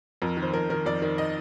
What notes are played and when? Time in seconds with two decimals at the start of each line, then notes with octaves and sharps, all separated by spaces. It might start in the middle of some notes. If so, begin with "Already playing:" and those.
0.22 F2 A#4
0.37 D#3
0.42 C5
0.53 F2 A#4
0.70 D#3 A#4
0.86 F2 D5
1.02 D#3
1.18 D#5